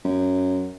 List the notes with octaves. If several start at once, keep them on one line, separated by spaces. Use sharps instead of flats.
F#2